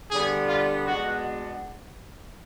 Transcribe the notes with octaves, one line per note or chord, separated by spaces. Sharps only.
D3 G3 B3 G#4
F4
B2 G#3 B3 D4 F#4